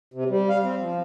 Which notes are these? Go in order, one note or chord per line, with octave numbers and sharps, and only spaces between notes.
C3
G3
F5
C4
F3